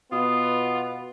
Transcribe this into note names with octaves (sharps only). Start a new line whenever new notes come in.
B2 B3 F4 D#6